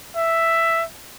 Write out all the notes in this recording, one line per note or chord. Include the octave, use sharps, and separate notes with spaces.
E5